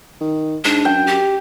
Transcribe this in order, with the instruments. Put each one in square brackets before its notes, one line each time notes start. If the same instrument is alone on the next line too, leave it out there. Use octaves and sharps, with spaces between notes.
[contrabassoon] D#3
[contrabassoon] G#2 [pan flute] D4
[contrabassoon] F#2 [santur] G5
[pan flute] G4